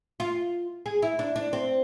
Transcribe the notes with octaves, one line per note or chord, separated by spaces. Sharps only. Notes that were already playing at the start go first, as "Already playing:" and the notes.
F4
G#4
E4
D4
D4
C4